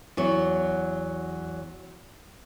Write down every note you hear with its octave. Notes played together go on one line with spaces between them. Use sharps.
E2 F#3 F#4